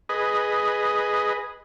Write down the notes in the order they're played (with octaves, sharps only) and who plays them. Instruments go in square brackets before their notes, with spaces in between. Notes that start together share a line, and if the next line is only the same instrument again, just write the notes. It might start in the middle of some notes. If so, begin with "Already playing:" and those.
[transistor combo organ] G#4 B4 D#5